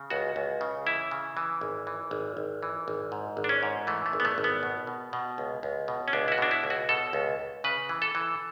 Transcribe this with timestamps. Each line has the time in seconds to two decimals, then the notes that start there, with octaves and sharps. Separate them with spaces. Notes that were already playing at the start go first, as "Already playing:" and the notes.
Already playing: C#3
0.10 C#2 F#4
0.36 C#2
0.61 C#3
0.87 E3 E4
1.11 C#3
1.37 E3
1.61 G#1
1.87 E3
2.11 G#1
2.37 G#1
2.63 E3
2.88 G#1
3.12 G#2
3.37 G#1
3.44 D4
3.49 C#4
3.63 G#2
3.87 E3 A3
4.06 A3
4.13 G#1
4.20 B3
4.25 A3
4.38 G#1
4.44 B3
4.63 B2
4.87 B2
5.13 B2
5.38 C#2
5.63 C#2
5.88 B2
6.08 C#4
6.13 C#2 D4
6.28 E4
6.32 F#4
6.38 B2 D4
6.51 E4
6.64 C#2
6.70 F#4
6.89 B2 A4
7.13 C#2
7.39 C#2
7.64 C#3 B4
7.89 E3
8.02 A4
8.15 E3